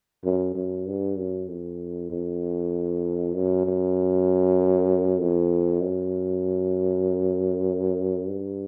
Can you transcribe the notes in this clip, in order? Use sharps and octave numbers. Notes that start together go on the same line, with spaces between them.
F#2
F#2
G2
F#2
F2
F2
F#2
F#2
F2
F#2
G2